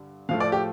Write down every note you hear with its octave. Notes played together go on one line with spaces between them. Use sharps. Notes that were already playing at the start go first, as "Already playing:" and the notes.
Already playing: G2 D3
A2 F3 A3 F5
D5
G4